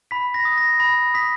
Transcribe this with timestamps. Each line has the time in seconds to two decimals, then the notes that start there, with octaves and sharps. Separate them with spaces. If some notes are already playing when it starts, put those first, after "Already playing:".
0.11 B5 B6
0.34 A#6
0.45 D#6
0.58 A#6
0.80 B5 A#6
1.14 D#6 B6